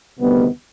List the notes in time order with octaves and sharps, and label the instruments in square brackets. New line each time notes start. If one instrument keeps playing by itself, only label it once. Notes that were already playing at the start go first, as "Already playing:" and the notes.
[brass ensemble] D2 C3 D#3 G3 B3